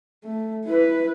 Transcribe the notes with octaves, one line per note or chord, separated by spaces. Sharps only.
A3
E4 B4